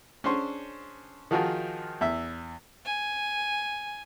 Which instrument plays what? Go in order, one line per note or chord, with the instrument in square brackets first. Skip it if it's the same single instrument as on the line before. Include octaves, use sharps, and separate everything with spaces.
[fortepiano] C#4 D4 G#4 C5 C6 C#6
D#3 F3 F4 F#4 G#4 A#4
E2 E5
[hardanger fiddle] G#5